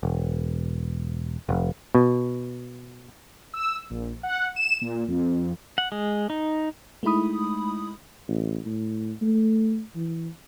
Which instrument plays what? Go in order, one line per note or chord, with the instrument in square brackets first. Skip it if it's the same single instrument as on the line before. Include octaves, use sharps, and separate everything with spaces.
[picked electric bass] E1
F1
[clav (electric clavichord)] B2
[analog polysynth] E6
A#1
F#5
E7
A#2
F2
[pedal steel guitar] F#5
G#3
D#4
[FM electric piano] G#3 A3 D#4 E4 B5 D#6
[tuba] A1
A2
A3
E3